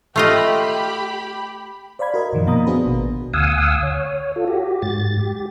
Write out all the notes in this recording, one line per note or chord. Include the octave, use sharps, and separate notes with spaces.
A3 F4 G4 D#5 B5
C5 D5 F5 B5 G#6
F#4 A#4 D#5
F#2 A#2 D#3 F3
B2 A#3 F5 A#5 B5 D#6
B3 D4 F#4 G#4 B4 C5
A1 B2
D2 F5 F#5 G#5 D#6 E6
C#5
F4 A4
F#4 G4
G#2 A6
G4